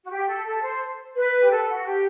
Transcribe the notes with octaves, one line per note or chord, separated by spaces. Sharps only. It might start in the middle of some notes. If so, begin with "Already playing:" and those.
F#4
G4
A4
A4
C5
B4
G4
A4
F#4
G4